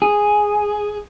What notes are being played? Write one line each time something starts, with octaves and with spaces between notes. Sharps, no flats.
G#4